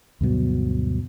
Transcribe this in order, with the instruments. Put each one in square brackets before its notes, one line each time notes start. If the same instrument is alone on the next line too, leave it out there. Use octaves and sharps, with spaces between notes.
[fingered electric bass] D2 G2 B2 F#3